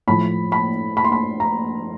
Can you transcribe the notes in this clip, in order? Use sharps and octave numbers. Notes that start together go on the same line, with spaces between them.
A2 F3 B5
B5
B5
C6
B5
A#5